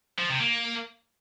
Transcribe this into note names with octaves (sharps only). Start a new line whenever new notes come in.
F3
C3
A#3